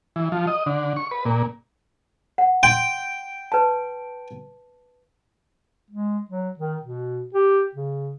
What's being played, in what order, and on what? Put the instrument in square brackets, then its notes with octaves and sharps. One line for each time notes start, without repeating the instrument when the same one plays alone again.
[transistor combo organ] E3
F3
D#5
D3
C#6
B4
A#2
[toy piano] F#5
[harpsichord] G5 [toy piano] C6
[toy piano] B4 A5
[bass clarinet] G#3
F#3
D#3
B2
G4
C#3